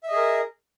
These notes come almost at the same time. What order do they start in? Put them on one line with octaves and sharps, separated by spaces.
E5 D#5 G#4 A#4